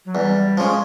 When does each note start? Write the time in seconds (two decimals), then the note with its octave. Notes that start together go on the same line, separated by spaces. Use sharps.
0.05 F#3
0.15 E2 G3
0.57 C#3 F3 G#3